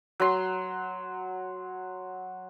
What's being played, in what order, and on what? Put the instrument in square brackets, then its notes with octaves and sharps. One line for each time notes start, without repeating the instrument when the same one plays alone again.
[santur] F#3 C6